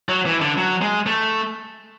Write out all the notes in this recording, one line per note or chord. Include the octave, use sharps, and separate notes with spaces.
F#3
E3
D3
F#3
G#3
A3